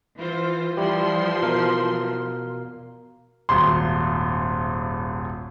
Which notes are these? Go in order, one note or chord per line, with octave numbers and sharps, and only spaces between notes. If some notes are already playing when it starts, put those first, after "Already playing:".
E3 F4 C5
E3 F3 G3 E4 G4 C6
B2 A#4 F5
D#1 G#1 C6